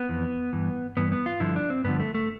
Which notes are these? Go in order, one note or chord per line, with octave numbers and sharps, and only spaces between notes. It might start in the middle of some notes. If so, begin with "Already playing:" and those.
Already playing: B3
F2 E3
G2 E3
G2 E3 B3
B3
F4
G2 D3 F3 E4
D4
C4
G2 D3 F3 B3
A3
A3